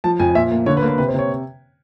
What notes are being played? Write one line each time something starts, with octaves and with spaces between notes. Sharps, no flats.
F3 A5
F2 G#5
A#2 E5
A#3
D3 C#5
B4
A#3
B4
C3 B4
C5
C3 C#5